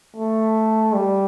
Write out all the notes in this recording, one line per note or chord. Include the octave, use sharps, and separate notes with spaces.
A3
G3